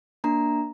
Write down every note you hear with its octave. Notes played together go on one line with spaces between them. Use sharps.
A#3 D4 A#5